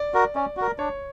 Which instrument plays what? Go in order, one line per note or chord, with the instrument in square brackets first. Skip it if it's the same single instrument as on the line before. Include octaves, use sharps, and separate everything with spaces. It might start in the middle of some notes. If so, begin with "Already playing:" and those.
Already playing: [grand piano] D5
[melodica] F#4 A#4
[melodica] C#4 [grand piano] D5
[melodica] F#4 A#4
[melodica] D4 [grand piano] C#5